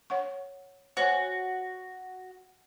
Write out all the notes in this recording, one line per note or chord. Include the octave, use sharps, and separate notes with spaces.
C#5 F#5 C#6
F#4 C5 C#5 G#5